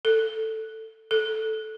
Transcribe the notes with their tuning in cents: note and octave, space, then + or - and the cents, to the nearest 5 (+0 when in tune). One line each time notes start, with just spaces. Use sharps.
A4 +10
A4 -5